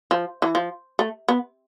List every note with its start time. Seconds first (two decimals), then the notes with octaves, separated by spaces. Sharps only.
0.11 F3
0.42 E3
0.55 F3
0.99 A3
1.28 B3